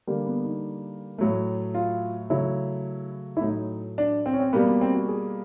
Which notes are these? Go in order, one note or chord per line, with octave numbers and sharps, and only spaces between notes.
D3 G3 A#3
B3
D#4
A2 F#3 A3
F4
C#3 F#3 A3 E4
E4
A2 F#3 A3 D#4
D4
C4
C#4
C4
B2 G3 A#3 B3
B3
C4
F#4
G#4